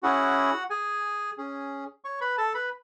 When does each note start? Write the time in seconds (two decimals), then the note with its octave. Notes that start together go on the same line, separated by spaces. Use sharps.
0.03 C#4 E4 F#4 G#4 F#5
0.70 G#4 G#5
1.38 C#4 G#4
2.04 C#5 C#6
2.21 B4 B5
2.38 A4 A5
2.54 B4 B5